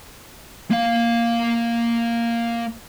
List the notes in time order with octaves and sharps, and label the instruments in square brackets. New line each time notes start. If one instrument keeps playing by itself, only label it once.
[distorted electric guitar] A#3 F5